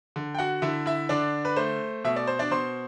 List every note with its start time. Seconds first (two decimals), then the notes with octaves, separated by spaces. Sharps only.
0.16 D3
0.35 G5
0.38 F#4 F#5
0.62 D3 E4 E5
0.86 E4 E5
1.09 D3 D4 D5
1.45 B4
1.56 A3 C5
2.04 B2 E5
2.16 D5
2.27 C5
2.39 D4 D5
2.51 B2 C5 C6